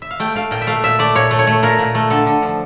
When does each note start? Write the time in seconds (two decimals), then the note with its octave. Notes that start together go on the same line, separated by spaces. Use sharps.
0.02 E5
0.11 F5
0.20 A3 G5
0.35 A3 F5
0.51 A#2 G5
0.62 E5
0.67 A3 F5
0.84 A#2 E5
0.99 A3 D5
1.15 A#2 C#5
1.31 A3
1.39 C#5
1.47 A3
1.63 A#2 A#4
1.79 A#2
1.95 A3
2.10 D3 A4
2.26 D3
2.42 F3